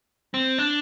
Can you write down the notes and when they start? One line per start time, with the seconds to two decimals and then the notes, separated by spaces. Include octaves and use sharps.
0.34 C4
0.58 D4